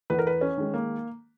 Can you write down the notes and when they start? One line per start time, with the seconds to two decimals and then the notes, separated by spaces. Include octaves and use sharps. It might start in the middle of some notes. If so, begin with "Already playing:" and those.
0.10 E2 B4
0.19 A#4
0.27 B4
0.41 C#4
0.57 D#3 G#3
0.74 A#3